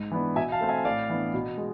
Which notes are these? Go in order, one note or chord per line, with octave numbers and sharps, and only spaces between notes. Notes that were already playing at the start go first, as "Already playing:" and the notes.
Already playing: G#2
E3 B3 D4
B2 E5 G#5
F5 A5
A3 C4
E5 G#5
A2 D5 F5
E3 B3 D4
B2
G#3